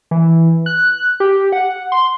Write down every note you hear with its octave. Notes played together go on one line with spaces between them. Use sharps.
E3
F#6
G4
F#5
C6